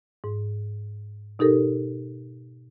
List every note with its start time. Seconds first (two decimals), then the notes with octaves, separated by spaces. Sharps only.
0.24 G#2
1.39 B2 D#4 G4 A4 A#4